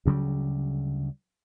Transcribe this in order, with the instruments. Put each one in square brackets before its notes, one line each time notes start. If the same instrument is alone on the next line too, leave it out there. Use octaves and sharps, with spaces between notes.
[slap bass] D2 C#3 F#3 G3